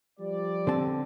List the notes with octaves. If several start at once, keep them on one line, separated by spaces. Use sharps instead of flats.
F3 G3 D5
D3 C4 A5